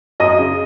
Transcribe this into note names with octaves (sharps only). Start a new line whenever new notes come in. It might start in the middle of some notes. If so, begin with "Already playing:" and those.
F#2 D#5
C#3